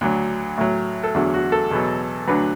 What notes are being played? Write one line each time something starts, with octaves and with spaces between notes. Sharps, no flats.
D2 D3 F#3
A2 F#3
A4
E2 D3 F#3 F#4
F#4
A4
E2 B2 F#3
D2 D3 F#3 B4